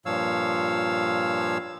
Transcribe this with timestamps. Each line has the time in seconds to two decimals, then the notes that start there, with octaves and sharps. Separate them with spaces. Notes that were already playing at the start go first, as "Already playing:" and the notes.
0.06 G2 A#2 F3 C#5 F5 E6